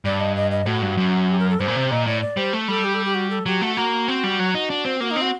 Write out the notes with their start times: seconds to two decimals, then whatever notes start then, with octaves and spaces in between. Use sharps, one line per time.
0.05 G2 D5
0.20 D#5
0.36 D#5
0.51 D#5
0.66 A2 F#4
0.82 G2
0.97 F#2
1.29 G4
1.39 A#4
1.50 A4
1.60 G2 C5
1.68 A#2
1.76 C3
1.91 A#2 D#5
2.06 A2 D5
2.22 D5
2.37 G3 C5
2.53 A3
2.68 G3 A4
2.84 G4
2.94 A4
3.04 G4
3.15 F#4
3.30 A4
3.46 F#3 G4
3.61 A3 F#4
3.76 A#3 F#4
4.08 C4
4.24 G3
4.39 F#3
4.55 D#4
4.70 D4
4.85 C4
5.00 A#3 F#4
5.11 D#4
5.16 C4
5.22 F#4